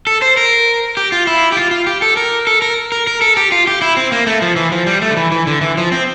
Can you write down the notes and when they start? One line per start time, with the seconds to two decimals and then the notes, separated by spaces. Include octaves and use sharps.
0.07 A4
0.22 C5
0.37 A#4
0.97 G4
1.12 F4
1.27 E4
1.52 G4
1.57 F4
1.71 F4
1.87 G4
2.02 A4
2.17 A#4
2.47 A4
2.62 A#4
2.92 A#4
3.07 A#4
3.22 A4
3.37 G4
3.52 F4
3.67 G4
3.82 E4
3.97 C4
4.12 A#3
4.27 A3
4.42 F3
4.56 E3
4.72 F3
4.87 G3
5.02 A3
5.11 D3
5.17 E3
5.32 E3
5.47 D3
5.61 E3
5.77 F3
5.92 C4